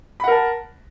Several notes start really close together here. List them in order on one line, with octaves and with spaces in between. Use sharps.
B5 F#5 A#4 A5